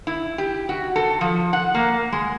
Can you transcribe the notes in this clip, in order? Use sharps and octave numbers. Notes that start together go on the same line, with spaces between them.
E4
G4
F#4
A4
F3
F#5
A#3
G#3